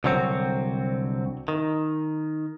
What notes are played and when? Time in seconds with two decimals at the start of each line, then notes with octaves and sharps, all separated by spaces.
0.04 C2 D3 F#3 C4 F#4
1.48 D#3